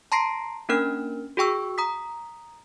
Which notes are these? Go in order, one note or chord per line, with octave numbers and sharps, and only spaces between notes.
A5 A#5 C6 A#6 C7 D7
A#3 C#4 D4 A#4 F6
F#4 G#4 G5 C#6 E6
A#5 D#6 B6